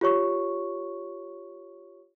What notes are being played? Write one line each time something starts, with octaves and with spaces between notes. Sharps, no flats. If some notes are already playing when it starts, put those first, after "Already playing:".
F4 G4 C#5 C#6